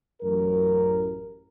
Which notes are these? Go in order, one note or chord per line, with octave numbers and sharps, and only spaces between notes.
A1 F#2 A#4